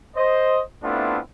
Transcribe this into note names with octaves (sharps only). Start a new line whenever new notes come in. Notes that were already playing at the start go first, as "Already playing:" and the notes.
C5 D#5
A3 B3 C4 D4 E4 F4